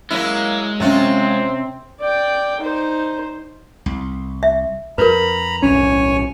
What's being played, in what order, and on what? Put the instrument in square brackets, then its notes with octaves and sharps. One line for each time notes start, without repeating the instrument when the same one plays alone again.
[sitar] F#3 E4 [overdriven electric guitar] G#3 [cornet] A#3
[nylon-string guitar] C3 C#4 [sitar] F#3 F4 [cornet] C4
[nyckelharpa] D5 G5
D#4 C5
[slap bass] C2
[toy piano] E5
[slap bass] F2 [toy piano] A#4 B4 [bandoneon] A#5 B5
[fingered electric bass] D1 B1 C#4 [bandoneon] C#5 G#5